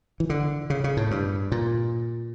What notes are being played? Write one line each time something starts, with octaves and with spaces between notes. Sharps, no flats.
E3
D3
C#3
C#3
A2
G2
A#2